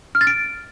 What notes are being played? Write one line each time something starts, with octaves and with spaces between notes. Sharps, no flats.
F6
A6
D7